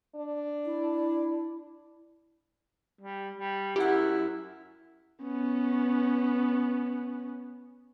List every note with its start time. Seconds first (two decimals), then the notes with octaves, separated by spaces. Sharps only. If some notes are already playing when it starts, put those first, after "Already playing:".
0.15 D4
0.66 E4
3.01 G3
3.38 G3
3.76 F#2 E4 G4 F#5
5.22 B3 C#4